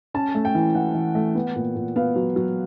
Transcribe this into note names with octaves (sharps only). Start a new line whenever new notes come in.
C#4 A5
A3
G5
E3
E3 F#5
E3
A3
B3
A#2
A#2
B3 F5
F#3
F#3